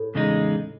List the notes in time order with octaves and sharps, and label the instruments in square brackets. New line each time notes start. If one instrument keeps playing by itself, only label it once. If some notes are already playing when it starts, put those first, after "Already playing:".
Already playing: [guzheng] A2
[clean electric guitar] E2 C#3 G#3 D#4